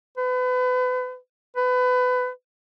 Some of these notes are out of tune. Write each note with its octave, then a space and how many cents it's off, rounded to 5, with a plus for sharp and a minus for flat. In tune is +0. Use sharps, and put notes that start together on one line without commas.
B4 +35
B4 +25